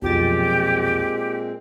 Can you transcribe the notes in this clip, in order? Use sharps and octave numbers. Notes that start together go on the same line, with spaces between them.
B1 F2 A#2 G#3 C4 G4 A6